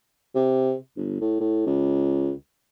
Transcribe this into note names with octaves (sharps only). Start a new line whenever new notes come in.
C3
G1
A2
A2
C#2